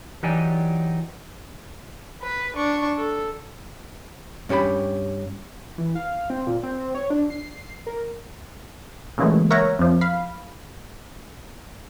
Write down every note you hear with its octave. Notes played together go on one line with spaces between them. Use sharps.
E3 F#3 D#4 G4 D5 G#5
B4
D4 C#6
A4
G2 C#4 G4 A#4 B5
E3
F5
C4
A#2
C4
C#5
D4
C7
A#4
A#2 C#3 E3 F#3 G#3 A3
A#4 C#5 E5 F#5 A#5
F2 F3
F5 B5